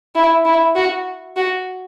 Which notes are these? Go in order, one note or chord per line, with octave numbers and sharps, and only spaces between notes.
E4
E4
F#4
F#4